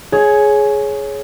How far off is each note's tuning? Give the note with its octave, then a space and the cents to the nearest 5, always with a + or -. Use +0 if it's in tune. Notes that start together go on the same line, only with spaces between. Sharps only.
G#4 +15 C#5 +0